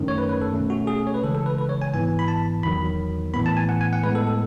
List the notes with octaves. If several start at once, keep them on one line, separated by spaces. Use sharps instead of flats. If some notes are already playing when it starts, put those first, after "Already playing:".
Already playing: F#2 D#3 A3 C#4
C#5
B4
B4
A4
B2 A3 C#4
F#4
G#4
C#5
B4
C#3 E3 G#3 A4
A4
B4
B4
C#5
G#5
G#2 E3 B3 G#5
B5
A5
E2 D#3 F#3 B5
A2 E3 B3 B5
A5
G#5
F#5
G#5
F#5
A2 G#3 B3 B4
A4
A4